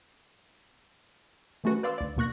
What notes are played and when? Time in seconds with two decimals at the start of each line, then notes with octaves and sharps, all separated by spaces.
1.64 E3 A3 C#4 F#4 B4
1.83 B4 D5 F5 C6 E6
1.98 D2 D5
2.16 D#2 B2 A#3 C#6 F#6 A#6